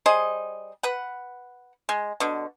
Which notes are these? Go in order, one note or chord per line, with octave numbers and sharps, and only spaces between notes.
G3 G#4 C5 D#5
B4 F#5
G#3
B2 D3